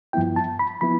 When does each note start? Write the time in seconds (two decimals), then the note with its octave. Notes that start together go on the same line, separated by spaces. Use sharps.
0.13 G2 F3 B3 E4 G5
0.36 A5
0.59 B5
0.81 F3 B3 E4 B5